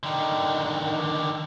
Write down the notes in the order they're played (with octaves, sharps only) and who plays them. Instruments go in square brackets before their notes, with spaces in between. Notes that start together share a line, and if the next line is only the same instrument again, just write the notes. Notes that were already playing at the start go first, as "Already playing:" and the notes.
[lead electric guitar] D3 D#3